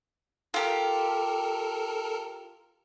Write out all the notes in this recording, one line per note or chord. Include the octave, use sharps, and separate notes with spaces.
F4 G4 A4 A#4